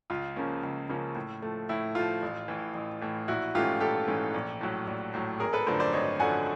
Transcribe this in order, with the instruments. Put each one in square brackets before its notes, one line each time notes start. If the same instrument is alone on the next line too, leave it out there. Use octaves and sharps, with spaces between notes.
[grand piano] C#2 F4
C#3 F3 A#3 C#4
C#2
C#3 F3 A#3 C#4
A2
F3 A3
A2 E4
F3 A3 F4
A1
A2 E3
A1
A2 E3
A#1 E4 F#4
G#2 E3 A3 C#4 F4 G4
A#1 G4 A4
G#2 E3 A3 C#4
A#1
A2 F#3
A#1
A2 F#3
G#1 G#4 A#4
A4 B4
F#2 D3 F3 A3 A#4 C5
C5 D5
G#1 C#5 D#5
F#2 D3 F3 A3 F#5 G#5